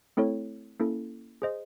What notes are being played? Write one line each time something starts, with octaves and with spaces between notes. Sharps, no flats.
A3 C4 E4 A4 C#5
A#3 C#4 E4 A4
G#4 C5 D#5